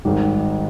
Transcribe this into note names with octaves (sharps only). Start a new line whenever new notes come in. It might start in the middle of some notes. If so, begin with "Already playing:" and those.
G#1 G#2 D#3 G3